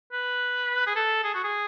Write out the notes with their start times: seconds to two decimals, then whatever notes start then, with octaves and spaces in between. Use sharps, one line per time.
0.12 B4
0.87 G#4
0.96 A4
1.24 G#4
1.34 F#4
1.44 G#4